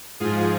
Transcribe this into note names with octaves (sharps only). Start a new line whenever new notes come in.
G#2 F3 F4 G#4